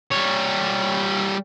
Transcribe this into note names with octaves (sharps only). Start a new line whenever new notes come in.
G3 C#5